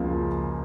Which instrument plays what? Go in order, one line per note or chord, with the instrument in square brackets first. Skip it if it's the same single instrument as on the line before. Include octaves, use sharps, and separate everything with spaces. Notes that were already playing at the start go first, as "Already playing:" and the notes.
Already playing: [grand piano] C#2 C#3 F3 A#3